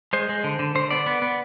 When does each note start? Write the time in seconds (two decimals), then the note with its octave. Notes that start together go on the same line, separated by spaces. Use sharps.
0.13 G#3 C5
0.29 G#3
0.44 D3
0.59 D3
0.75 D3 C5
0.90 B3 D5
1.06 B3
1.22 B3